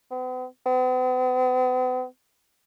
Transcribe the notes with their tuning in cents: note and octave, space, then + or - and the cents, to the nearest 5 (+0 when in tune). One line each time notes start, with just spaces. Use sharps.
B3 +45
B3 +45